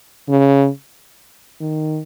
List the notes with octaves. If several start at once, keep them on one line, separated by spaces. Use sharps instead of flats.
C#3
D#3